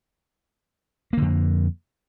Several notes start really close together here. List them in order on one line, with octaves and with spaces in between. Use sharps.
A#3 D3 F2